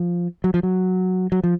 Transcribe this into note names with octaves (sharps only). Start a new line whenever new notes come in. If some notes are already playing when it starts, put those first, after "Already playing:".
Already playing: F3
F#3
F3
F#3
F#3
F3